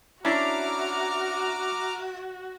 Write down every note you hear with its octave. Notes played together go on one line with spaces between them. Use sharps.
C#4 D4 E4 F#4 A#5 D6 F6